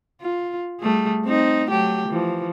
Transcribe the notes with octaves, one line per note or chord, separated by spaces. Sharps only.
F4
G3 A3 G#4
C4 D#4
F#3 A3 G4
E3 F3